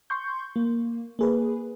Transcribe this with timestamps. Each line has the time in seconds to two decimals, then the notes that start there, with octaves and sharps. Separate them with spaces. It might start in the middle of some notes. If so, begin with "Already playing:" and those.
0.10 C6 C#6 G6
0.56 A#3
1.19 A#3 G#4 B4